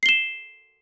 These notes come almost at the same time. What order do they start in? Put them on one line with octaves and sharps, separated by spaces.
C7 G7 E7